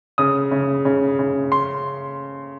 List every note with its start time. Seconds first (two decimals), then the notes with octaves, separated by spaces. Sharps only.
0.18 C#3 D#6
0.51 C#3
0.85 C#3
1.19 C#3
1.52 C6